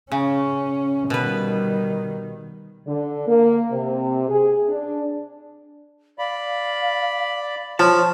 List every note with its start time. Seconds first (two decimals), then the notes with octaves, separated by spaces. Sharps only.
0.12 C#3 C#4
1.10 B2 D#3 G3 B4
2.87 D3
3.28 A#3
3.72 C3
4.29 G#4
4.68 D4
6.19 D5 F5 B5
7.79 F3 C#5 A5